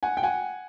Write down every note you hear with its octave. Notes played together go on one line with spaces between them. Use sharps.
F#5 G#5
G5
F#5 G#5